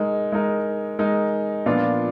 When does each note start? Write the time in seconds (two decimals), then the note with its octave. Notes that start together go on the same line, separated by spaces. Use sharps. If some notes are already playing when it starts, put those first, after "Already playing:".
Already playing: G#3 D#4 A#4
0.32 G#3 D#4 A#4
0.99 G#3 D#4 A#4
1.66 A#2 F3 B3 D4 F4